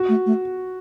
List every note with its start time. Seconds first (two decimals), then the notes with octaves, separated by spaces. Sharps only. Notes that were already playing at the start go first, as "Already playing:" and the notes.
Already playing: F#4
0.09 A3
0.26 A3